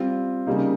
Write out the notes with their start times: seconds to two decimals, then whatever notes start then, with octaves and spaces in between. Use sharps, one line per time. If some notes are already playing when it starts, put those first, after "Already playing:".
Already playing: G3 C4 F4
0.47 C#3 G3 A#3 D#4